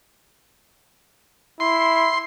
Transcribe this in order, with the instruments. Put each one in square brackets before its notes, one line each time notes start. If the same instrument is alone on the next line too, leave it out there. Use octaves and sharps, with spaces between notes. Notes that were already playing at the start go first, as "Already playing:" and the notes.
[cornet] E4 [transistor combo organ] C6